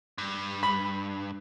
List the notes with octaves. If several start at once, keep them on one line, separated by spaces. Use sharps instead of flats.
G2
B5